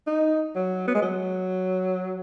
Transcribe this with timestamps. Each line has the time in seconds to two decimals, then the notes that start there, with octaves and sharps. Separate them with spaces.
0.07 D#4
0.56 F#3
0.88 B3
0.95 G#3
1.02 F#3